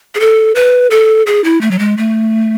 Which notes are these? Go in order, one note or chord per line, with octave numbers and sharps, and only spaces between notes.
G#4
A4
B4
A4
G#4
E4
A3
F#3
G#3
A3